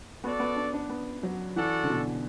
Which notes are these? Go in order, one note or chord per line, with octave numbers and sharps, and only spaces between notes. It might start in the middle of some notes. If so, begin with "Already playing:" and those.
B3 F#4 A4 D5
B3
D4
D4
B3
F#3
E3 F#4 A4 D5 F#5
D3
B2